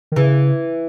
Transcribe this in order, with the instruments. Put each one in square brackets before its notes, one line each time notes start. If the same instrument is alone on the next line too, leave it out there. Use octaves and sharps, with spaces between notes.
[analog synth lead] D#3
[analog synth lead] C#3 [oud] E3